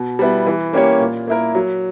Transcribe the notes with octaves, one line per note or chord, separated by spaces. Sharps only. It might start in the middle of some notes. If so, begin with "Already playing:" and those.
Already playing: B2
G3 B3 E4
E3
A#3 C#4 G4 C#5
A#2
A#3 E4 A#4
F#3